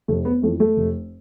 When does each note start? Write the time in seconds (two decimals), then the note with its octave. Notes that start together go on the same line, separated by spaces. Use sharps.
0.08 F1 A3
0.25 B3
0.42 F2 E3 A3
0.60 A3
0.77 F1